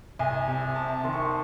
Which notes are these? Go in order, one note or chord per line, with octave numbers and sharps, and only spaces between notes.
C2 G#5
C3
C3 A5
D#3 C6
C#6
C6